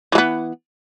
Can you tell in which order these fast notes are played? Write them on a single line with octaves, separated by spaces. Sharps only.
E3 G#3 B3